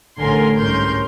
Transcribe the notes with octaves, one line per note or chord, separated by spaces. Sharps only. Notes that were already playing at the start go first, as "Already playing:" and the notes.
A1 A2 D3 A#4 G#5 C6
C2 G#2 C#4 A#4 C6 G6